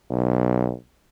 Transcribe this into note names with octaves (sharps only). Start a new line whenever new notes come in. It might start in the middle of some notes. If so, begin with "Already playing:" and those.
B1